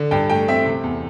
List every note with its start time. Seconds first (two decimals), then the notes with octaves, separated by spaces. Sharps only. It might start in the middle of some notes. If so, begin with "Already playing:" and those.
Already playing: D3
0.11 G2 G5
0.30 A3 G5
0.48 C4 E5
0.66 C3
0.84 E2